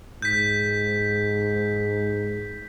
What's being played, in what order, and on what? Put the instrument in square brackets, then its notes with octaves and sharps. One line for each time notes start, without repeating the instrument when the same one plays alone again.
[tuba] G#2 [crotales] G6 B6